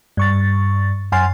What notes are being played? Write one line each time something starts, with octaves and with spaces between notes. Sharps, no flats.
G2 C#6 A6
F#2 F#5 G#5 C6 F6 A6